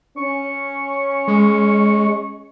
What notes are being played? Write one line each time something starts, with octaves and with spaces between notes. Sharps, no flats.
C#4 C#6
G#3